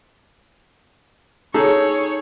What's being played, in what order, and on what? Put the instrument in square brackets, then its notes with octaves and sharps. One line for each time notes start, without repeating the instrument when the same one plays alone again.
[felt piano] D#4 G#4 [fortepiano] A4 [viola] C#5